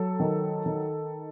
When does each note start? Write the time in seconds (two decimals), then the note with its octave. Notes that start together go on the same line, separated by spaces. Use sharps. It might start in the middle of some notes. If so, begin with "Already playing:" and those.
Already playing: F#3 A4
0.20 D#3
0.66 D#3